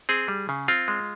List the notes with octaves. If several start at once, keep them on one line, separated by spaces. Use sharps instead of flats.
C4 G#4
G3
C#3
C4 F4
G#3